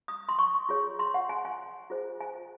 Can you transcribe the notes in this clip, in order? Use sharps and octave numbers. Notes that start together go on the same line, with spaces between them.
D#6
C6
C#6
F4 G#4 C#5
C6
F#5
G#5
G#5
F4 G#4 C5
G#5